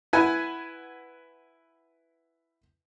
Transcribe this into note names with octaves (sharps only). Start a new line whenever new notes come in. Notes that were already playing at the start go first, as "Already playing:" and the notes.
E4 B4 F#5 G#5